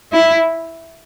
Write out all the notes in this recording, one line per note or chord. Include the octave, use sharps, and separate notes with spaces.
E4